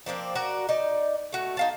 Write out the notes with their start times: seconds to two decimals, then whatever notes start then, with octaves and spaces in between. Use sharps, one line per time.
0.06 F3 A#3 C4 D4
0.35 F#4 A#4 D5
0.69 D#4 D5
1.32 A3 F#4
1.57 D#4 F5 A5